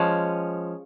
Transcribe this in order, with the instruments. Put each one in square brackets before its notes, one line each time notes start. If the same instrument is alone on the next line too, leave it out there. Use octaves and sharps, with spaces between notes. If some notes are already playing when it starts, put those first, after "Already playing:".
Already playing: [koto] F3 G#3 C#4